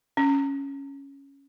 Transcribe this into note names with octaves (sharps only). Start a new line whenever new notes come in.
C#4